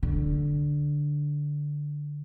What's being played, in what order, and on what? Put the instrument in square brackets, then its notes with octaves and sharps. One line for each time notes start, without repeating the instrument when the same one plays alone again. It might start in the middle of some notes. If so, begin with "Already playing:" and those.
[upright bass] D3